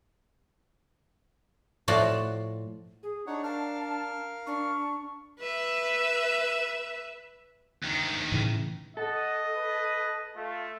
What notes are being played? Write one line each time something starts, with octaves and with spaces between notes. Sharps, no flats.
A2 F3 F4 F#4 D5
G#4
D4 D#4 C#5 F#5
A#4 F5 A5 F6
D4 C#6
B4 E5
D2 D#3
A2 C#3 E3
A4 D#5 F#5
B4
A3 F4